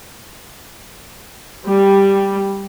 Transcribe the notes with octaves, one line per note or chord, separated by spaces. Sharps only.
G3